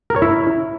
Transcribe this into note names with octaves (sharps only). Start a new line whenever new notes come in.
A#4
C#5
E4